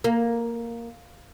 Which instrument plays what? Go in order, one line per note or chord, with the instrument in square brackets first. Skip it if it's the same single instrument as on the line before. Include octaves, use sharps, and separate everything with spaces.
[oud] A#3